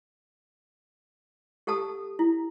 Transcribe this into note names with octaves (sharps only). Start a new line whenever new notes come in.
G4 A4 F#5 A5 D#6 E6
E4